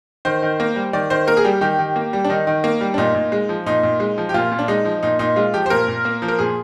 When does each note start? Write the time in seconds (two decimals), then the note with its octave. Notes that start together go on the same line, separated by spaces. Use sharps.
0.25 D#3 C5
0.42 D#3
0.60 A#3
0.76 G3
0.93 D#3 D5
1.10 D#3 C5
1.27 A#3 A#4
1.37 G#4
1.44 G3 G4
1.61 D#3 G4
1.79 D#3
1.96 A#3
2.13 G3
2.24 D4
2.29 D#3 D#4
2.47 D#3
2.64 A#3
2.81 G3
2.94 D4
2.98 A#2 D#4
3.15 A#2
3.32 G#3
3.49 F3
3.66 A#2 D#4
3.83 A#2
4.00 G#3
4.18 F3
4.29 G4
4.34 A#2 F4
4.51 A#2
4.59 D4
4.68 G#3 D#4
4.85 F3
5.03 A#2 D#4
5.19 A#2 D#4
5.36 G#3 F4
5.54 F3 G4
5.66 C5
5.70 A#2 A#4
5.88 A#2
6.05 A#3
6.22 F3
6.28 A#4
6.39 A#2 G#4